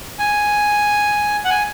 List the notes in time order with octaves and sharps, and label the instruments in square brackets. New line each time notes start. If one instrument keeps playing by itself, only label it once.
[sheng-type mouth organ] G#5
F#5
G#5